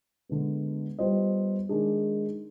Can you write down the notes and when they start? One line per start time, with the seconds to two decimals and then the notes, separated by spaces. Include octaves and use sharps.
0.29 D3 G#3 B3
0.99 G3 B3 F4 C5 D#5
1.69 D#3 G#3 D4 G#4